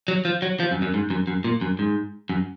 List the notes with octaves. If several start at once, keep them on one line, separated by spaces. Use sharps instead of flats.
F#3
F3
F#3
F3
F#2
F#2
G#2
F#2
F#2
A#2
F#2
G#2
F#2